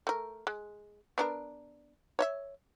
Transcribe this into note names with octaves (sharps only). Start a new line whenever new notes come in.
A3 A#4
G#3
B3 D4 A#4
C#5 D#5 E5